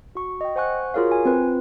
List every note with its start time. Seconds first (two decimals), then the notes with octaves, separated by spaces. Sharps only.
0.15 F#4 C#6
0.41 D#5 G5
0.56 C5 F#5 G#5 C#6 F#6
0.94 F4 F#4 G#4 A#4 C#5 F5
1.11 G#5
1.25 C4 F4 B4